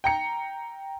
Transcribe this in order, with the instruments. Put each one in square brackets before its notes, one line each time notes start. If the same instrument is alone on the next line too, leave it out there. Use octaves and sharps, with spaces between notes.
[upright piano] G5 A#5 C#7